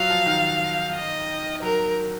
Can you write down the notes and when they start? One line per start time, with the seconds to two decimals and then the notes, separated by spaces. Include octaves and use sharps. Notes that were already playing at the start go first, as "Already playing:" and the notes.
Already playing: F#3 F4 F#4 F5
0.10 F3
0.26 D#3
0.94 D#5
1.62 F#3 A#4